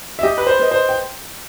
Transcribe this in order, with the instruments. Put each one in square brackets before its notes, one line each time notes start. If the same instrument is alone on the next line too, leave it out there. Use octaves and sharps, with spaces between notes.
[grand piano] E5
[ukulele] G4 [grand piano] D#5
[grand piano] B4
C5
[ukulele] B4 D#5
[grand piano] C5
G5